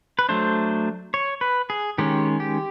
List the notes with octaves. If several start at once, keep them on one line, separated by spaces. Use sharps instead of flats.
B4
F#3 A3 D4 C5
C#5
B4
G#4
D#3 G#3 C#4 G4
G4